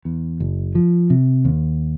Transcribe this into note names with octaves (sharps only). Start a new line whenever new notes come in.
E2
F#1
F3
C3
D#2